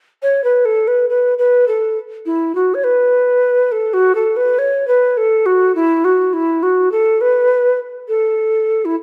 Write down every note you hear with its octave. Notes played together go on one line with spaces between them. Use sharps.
C#5
B4
A4
B4
B4
B4
A4
E4
F#4
C#5
B4
A4
F#4
A4
B4
C#5
B4
A4
F#4
E4
F#4
E4
F#4
A4
B4
A4
E4